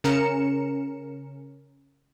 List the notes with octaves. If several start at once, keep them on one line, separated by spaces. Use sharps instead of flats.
C#3 C#4 A#4 A#5 C#7 E7